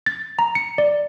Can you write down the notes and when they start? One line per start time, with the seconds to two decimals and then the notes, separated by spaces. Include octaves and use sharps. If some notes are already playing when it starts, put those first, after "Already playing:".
0.06 A6
0.39 A#5
0.55 C#7
0.78 D5